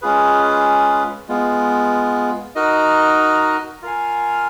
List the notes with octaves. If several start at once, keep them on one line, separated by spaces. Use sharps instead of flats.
G#3 C#4 F4 G#4 B4
G#3 B3 F4
D#4 F#4 A#4 D#5
F4 A#4 F5 G#5